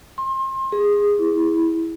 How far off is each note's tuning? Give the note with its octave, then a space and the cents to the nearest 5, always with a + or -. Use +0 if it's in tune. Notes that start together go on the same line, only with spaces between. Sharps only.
C6 +35
G#4 -15
E4 -10